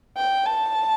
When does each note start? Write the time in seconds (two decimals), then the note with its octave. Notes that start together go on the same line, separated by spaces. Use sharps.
0.17 G5
0.46 A5